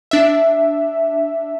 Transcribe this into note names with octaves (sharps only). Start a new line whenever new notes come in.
D4 E5